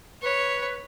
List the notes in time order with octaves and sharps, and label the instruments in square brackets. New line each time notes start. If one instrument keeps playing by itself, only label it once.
[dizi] B4 [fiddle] C#5